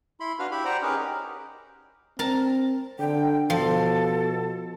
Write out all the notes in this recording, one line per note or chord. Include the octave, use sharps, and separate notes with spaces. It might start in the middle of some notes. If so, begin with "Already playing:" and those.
E4 B5 C6
D4 F#4 B4 F5 F6
E4 G4 E5 B5
C5 D5 F#5 G5 A#5
C#4 D#4 G4 G#4 A#4 B4
C4 A#4 A5
D3 G5
B2 F3 A4